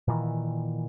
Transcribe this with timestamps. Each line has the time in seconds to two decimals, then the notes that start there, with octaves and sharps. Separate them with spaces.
0.08 A#2 D#3 E3